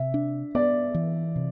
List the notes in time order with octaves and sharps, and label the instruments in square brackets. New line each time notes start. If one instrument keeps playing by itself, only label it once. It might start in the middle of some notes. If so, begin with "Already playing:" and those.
Already playing: [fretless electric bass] C3 [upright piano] E5
[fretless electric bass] D4
[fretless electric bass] B3 [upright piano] D5
[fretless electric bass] E3
C3